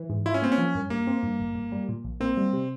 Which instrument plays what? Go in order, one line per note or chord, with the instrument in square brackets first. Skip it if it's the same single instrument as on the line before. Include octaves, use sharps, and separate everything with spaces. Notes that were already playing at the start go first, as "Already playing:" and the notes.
Already playing: [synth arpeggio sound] E3
G#2
[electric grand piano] E4 [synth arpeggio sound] F4
[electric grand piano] C#4
[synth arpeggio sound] A#3 [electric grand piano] C4
[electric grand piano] C#4
[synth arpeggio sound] F3
G2
[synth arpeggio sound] G2 [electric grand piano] A#3
[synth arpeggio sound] C4
G2
G1
G1
G3
A#2
A#1
[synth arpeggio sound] A#3 [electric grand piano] C4
[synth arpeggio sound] G3
C3